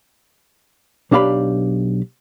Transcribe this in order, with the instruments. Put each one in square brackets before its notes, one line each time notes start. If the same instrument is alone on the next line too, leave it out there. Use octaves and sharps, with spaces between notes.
[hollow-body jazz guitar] B1 D4 G4 F5 B5